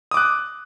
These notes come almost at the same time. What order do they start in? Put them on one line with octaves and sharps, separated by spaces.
D#6 D6 F#6